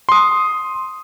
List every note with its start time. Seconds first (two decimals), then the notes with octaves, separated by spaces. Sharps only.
0.09 C6 D#6